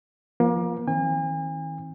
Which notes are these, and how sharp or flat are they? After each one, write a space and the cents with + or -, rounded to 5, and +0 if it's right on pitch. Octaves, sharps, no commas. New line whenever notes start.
F3 +0 A#3 +35
D#3 +40 C4 +20 G#5 -40